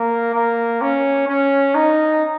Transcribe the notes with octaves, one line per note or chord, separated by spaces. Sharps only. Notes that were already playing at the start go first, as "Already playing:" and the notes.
Already playing: A#3
A#3
C#4
C#4
D#4